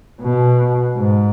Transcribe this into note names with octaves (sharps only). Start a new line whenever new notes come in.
B2
G#2